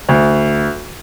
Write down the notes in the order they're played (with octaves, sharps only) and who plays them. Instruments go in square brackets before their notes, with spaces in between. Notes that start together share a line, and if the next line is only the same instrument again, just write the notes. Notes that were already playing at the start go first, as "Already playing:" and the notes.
[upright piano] D2